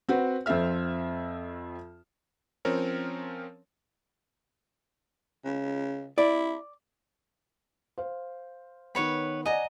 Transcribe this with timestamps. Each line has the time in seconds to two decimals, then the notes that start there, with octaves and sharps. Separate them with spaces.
0.09 C4 F#4 B4
0.46 F2 C4 F4 A4 E5 F6
2.65 F3 C4 C#4 A#4 C#5
5.45 C#3
6.18 E4 D5
7.98 C5 F5
8.95 D#3 B3 B4 C#5 B5
9.46 D5 D#5 F#5 G#5 A#5